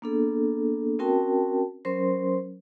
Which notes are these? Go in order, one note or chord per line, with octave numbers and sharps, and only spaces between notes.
A#3 B3 D4 G#4 A4
C4 C#4 F#4 A#4 G5 A5
F#3 C#4 A#4 C5 C6